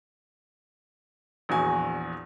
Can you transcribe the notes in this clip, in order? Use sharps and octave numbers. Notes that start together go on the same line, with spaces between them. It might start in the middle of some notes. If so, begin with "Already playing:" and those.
A#1 E2 F#4 G#5